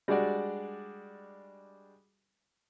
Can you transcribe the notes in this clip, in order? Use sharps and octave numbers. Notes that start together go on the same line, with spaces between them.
G3 G#3 D4 F#4 D5